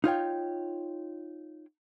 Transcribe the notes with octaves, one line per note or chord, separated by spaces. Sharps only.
D#4 F4 C#5 G5